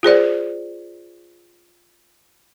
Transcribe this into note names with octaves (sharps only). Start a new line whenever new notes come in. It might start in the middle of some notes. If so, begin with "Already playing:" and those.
F4 G#4 C5 D5